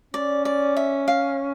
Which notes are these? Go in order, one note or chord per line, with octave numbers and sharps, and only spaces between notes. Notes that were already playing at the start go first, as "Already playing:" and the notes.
C#4 D5
D5
E5
F5